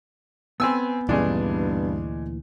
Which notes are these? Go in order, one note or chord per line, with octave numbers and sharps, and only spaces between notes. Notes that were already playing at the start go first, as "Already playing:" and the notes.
B3 C4 B4 G#5 E6
D2 G2 A#2 C#3 E3 G#3 D4